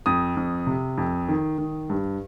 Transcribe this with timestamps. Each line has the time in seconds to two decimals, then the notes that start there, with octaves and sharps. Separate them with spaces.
0.06 F2 D#6
0.37 F2
0.67 C3
0.98 F2
1.28 D#3
1.58 D#3
1.90 G2